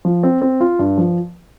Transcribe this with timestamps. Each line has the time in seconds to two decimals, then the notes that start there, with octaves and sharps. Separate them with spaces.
0.05 F3
0.23 C4
0.42 C4
0.61 F4
0.79 G2
0.98 F3